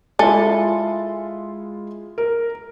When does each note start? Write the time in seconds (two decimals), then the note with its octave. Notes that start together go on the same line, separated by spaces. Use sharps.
0.19 G#3 E4 F4 A4 G#5
2.18 A#4